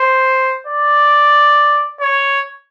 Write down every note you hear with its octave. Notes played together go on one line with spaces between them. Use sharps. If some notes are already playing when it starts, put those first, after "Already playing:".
Already playing: C5
D5
C#5